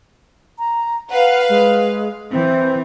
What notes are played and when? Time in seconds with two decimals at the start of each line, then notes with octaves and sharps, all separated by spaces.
0.59 A#5
1.10 B4 F5 F#5
1.49 G#3
2.31 E3 C4